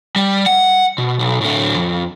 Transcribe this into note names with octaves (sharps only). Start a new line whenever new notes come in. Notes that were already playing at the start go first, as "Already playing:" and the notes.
G3
F#5
B2
B1
A2 D3
F2